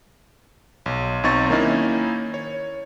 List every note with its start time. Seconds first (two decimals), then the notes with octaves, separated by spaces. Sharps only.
0.86 B1
1.23 B1 C4 D#4 C#6 A6
1.49 D#3 A#3 C#4 D#4 E4
2.34 C#5